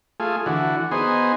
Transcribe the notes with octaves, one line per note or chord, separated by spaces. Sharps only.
A3 F4 G#4
D3 E3 F#4
B3 D#4 G#4 C5